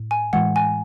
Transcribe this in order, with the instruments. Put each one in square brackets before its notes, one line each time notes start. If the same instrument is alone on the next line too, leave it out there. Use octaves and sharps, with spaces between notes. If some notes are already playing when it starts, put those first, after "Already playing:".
Already playing: [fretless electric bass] A2
[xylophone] G#5
[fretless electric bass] A2 E3 G#3 [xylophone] F#5
[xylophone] G#5